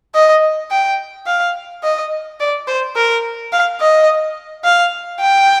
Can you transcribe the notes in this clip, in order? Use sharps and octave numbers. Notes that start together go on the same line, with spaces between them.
D#5
G5
F5
D#5
D5
C5
A#4
F5
D#5
F5
G5